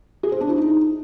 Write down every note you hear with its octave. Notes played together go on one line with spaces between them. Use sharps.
G#4
C5
D4
E4
D#4